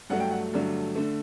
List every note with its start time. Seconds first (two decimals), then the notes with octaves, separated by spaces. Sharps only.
0.10 G2 F#3 A3 F#5
0.20 G5
0.31 F#5
0.53 G2 D3 F#3 A3
0.95 D3 A3